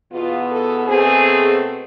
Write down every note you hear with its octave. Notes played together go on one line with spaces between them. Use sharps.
E2 B2 B3 F4
A4
B2 A3 C4 G#4